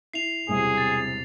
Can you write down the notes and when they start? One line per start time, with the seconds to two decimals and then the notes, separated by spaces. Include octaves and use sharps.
0.14 E4 C7 F7
0.48 E1 C3 G3 E4 G#4
0.78 A6